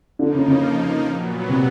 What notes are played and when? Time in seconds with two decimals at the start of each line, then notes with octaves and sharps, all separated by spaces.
0.19 D3 F3 A#3 D#4
0.34 C#3
0.48 C#3
1.06 A#2 F#3 B3
1.49 C3